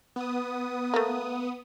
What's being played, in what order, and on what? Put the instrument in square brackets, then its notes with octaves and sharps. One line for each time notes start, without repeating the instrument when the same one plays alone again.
[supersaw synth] B3 D#6
[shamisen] A3 A#3